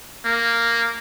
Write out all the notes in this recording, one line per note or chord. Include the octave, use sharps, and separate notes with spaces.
A#3